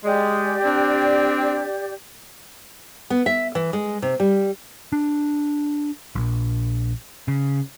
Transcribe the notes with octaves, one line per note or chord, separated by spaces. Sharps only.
G#3 G4 D5
C4 D4
B3
E5
E3
G#3
C3
G3
D4
A#1
C#3